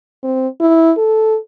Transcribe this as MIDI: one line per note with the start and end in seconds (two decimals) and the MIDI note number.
0.23 0.48 60
0.60 0.92 64
0.97 1.38 69